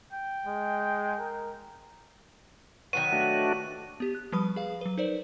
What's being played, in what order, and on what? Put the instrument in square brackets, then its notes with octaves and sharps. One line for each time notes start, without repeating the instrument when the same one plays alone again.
[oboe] G5
[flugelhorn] G#3
A#4
[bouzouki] D#3 F#3 B3 [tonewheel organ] C#6 [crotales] D#7
[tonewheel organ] A3 D4 F#4
[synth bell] B3 G4
F#6
F3 G3 B4 B5 D#6
G#4 F5
F#3 B4
D#4 A#4 C5 D5